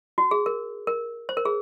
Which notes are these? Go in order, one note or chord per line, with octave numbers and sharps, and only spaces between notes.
F#4
G#4
A#4
A#4
C5
A#4
G#4